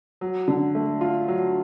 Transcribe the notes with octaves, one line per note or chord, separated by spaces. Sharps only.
F#3
D3
A3
F4
F#3